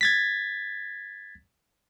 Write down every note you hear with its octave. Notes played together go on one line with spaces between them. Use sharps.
G#6 A6 B6